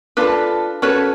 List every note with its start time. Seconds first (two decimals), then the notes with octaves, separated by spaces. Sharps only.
0.17 D4 F4 A4 B4
0.82 C#4 F#4 A4 B4 C#5